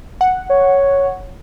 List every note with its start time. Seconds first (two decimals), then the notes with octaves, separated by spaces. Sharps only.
0.21 F#5
0.50 C#5